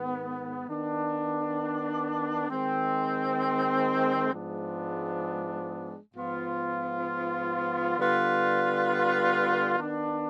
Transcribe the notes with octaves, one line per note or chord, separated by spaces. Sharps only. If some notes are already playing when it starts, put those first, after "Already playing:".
Already playing: G#2 D#3 B3
D#3 B3 D4
D#3 G#3 C4
G#2 F3 G#3 B3 D4
G#2 F3 B3 F4
D3 G3 B3 F4 B4
D#3 B3 D4